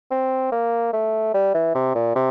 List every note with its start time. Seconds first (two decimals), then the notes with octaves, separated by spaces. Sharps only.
0.11 C4
0.52 A#3
0.93 A3
1.34 G3
1.54 E3
1.75 C3
1.95 A#2
2.15 C3